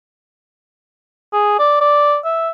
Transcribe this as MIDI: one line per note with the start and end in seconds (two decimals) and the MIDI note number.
1.33 1.59 68
1.59 1.79 74
1.81 2.17 74
2.25 2.50 76